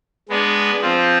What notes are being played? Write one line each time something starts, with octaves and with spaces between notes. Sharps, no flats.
G#3 B3 D4 G#4 B4
F3 C4 F4